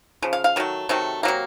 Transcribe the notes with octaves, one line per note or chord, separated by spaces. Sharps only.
C#3 F3
F5
F5
D#3 F#3 A3
C3 D#3 F#3 A3
C3 F#3 A#3